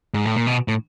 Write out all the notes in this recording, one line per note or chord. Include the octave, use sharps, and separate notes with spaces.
G#2
A2
A#2
B2
A2